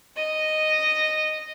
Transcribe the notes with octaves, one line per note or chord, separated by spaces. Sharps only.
D#5